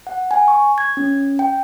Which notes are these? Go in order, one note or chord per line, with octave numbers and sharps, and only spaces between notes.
F#5
G#5
C#6
G#6
C#4
G5